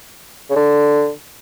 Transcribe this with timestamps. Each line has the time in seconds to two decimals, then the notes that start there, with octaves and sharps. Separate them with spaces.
0.50 C#3
0.56 D3